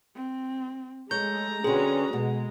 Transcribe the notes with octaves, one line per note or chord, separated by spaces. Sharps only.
C4
G#3 A3 C#5 A#5 G6
D3 C4 C#4 F#4 G#4 B4
B2 G#3